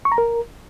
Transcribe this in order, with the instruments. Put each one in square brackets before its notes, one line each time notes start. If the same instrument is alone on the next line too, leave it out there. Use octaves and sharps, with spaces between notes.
[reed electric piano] C#6
A#5
A#4